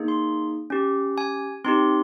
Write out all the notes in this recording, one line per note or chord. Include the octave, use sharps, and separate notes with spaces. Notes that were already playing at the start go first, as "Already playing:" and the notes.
Already playing: A#3 D#4 G#4
C6
C#4 G4
G#5
C4 D#4 G4 C6